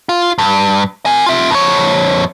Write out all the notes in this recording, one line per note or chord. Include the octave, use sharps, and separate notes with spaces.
F4
G2
A#4 G#5
F4 E5
F2 C#5